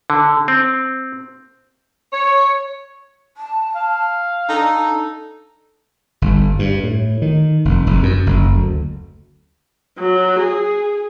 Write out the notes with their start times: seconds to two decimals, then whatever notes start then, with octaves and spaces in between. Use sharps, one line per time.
0.10 D3
0.48 C4
2.12 C#5
3.37 A5
3.75 F5
4.49 D4 D#4 A4
6.22 G1
6.59 G2
6.84 A2
7.22 D#3
7.65 F1
7.87 F1
8.03 F#2
8.26 F#1
8.56 D2
9.98 F#3
10.39 G#4